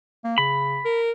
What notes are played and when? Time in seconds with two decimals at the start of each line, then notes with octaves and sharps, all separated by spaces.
0.24 A#3
0.38 C#3 B5
0.85 A#4